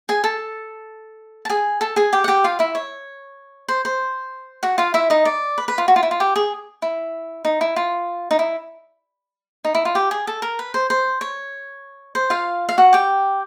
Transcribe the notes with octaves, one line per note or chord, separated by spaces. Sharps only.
G#4 G#5
A4 A5
A5
G#4 G#5
A4 A5
G#4 G#5
G4 G5
F#5
G4 G5
F4 F5
E4 E5
C#5
C5
C5
F#4 F#5
F4 F5
E4 E5
D#4 D#5
D5
B4
B4
F4
F#4
F4
E4
F4
G4
G#4
E4
D#4
E4
F4
D#4
E4
D#4
E4
F4
G4
G#4
A4
A#4
B4
C5
C5
C#5
C5
F4 F5
F5
F#4 F#5
G4 G5